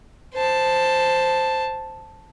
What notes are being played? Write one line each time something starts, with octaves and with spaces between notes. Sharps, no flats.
C5 A5